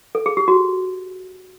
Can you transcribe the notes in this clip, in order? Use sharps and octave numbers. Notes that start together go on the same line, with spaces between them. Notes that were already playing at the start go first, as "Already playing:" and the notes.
A4
G#4
G4
F#4